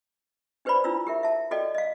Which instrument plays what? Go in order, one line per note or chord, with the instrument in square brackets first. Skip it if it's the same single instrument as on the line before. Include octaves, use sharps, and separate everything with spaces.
[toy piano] D4 G4 B4 C5 D5 B5
D4 E4 F4 E6
G4 A#4 E5
E5 A5
F#4 A4 D5 D#5 G5
D#5 F5